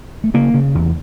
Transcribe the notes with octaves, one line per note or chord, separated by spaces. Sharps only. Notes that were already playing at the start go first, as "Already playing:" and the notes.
A3
C#3 A#3
C#3
E2